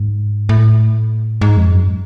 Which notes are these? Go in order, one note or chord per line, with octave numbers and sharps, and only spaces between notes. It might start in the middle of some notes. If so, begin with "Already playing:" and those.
Already playing: G#2
A2
G#2
F2
F#2